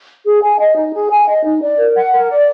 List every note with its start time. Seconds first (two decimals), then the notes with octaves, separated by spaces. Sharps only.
0.24 G#4
0.41 G#5
0.58 D#5
0.76 D#4
0.93 G#4
1.10 G#5
1.27 D#5
1.44 D#4
1.61 D5
1.78 A#4
1.96 F#5
2.12 A#4
2.29 D5